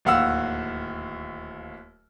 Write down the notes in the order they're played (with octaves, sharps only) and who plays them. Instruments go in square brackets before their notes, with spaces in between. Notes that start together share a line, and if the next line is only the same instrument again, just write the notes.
[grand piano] D1 D#2 F5 F#5 E6